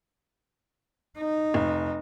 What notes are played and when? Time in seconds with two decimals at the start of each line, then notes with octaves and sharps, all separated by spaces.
1.18 D#4
1.54 F1